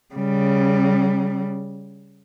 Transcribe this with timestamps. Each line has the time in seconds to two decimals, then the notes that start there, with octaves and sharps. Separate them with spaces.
0.15 C#3 G3